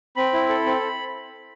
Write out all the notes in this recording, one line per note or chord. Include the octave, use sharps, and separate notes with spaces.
C4 B5
E4
A4
C4